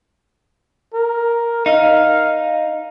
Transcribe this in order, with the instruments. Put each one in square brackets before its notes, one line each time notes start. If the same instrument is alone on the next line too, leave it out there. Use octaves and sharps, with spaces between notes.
[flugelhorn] A#4
[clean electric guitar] D#4 [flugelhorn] F5